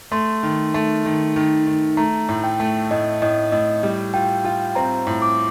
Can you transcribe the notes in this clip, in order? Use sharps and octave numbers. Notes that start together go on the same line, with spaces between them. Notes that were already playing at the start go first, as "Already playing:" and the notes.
A3 C6
D#3
A3
D#3
D#3
D#3
A3 A#5
A2
G5
A3
A2 D#5
A2 D#5
A2 D#5
G3
F4 G5
F4 G5
C4 A#5
A2
D6